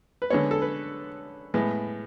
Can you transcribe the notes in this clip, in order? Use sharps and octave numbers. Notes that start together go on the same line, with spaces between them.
B4
D3 G#3 B3 C#5
A4
B4
A2 G#3 B3